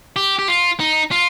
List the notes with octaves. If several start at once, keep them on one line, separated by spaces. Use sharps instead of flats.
G4
G4
F4
D#4
F4